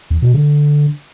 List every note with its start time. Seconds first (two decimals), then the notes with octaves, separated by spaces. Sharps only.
0.10 E2
0.22 B2
0.34 D3